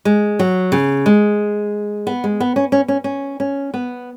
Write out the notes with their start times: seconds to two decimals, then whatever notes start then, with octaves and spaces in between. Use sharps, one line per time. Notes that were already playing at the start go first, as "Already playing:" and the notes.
0.05 G#3
0.39 F#3
0.72 C#3
1.06 G#3
2.07 B3
2.24 G#3
2.40 B3
2.56 C#4
2.72 C#4
2.88 C#4
3.04 C#4
3.40 C#4
3.74 B3